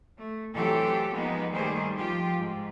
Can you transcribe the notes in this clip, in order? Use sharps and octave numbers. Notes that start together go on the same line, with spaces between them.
A3
E3 F#3 A3 C4 G4 A4
F3 G#3 A#3 B3 D#4
D#3 G3 A3 A#3 G#4 C5
F3 F4 G4
G#2